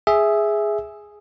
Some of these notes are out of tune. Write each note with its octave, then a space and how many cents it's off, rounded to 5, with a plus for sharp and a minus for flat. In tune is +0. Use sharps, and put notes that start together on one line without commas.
G#4 +0 E5 +0